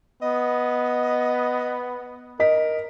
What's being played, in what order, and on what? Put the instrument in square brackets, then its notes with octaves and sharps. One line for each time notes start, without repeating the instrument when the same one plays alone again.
[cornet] B3 [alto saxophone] D#5
[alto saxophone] A#4 [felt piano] D#5 B6